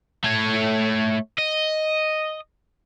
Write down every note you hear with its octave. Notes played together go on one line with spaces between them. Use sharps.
A3 C#5
D#5